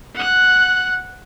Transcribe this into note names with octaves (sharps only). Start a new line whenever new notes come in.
F#5 F#6